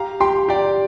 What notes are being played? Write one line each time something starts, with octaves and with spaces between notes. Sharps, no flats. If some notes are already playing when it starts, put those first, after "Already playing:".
Already playing: G4 F5 A#5
G4 G5 C6
G4 D5 G5